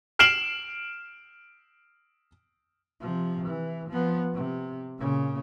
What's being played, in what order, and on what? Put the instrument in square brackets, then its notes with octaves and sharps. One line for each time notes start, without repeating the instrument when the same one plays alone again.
[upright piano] F6 C7 D7 E7 F#7
[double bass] C3 F3
E3
F3 B3
C3
A#2 C#3